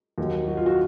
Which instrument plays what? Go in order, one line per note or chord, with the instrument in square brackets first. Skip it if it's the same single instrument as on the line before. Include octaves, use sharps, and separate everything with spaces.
[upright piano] D#2 D#3 F#3
F#4
F4
F#4